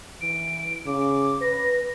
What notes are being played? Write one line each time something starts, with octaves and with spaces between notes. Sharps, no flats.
E3 D7
C#3 D6
B4 A#6